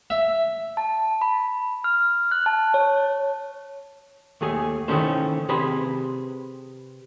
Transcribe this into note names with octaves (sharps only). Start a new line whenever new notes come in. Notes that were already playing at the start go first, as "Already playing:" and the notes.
E5
A5
B5
F6
F#6
A5
C#5
D#2 A3 G#4
D#3 E3 A3 C#4 C5
C3 G#4 B4 B5 C6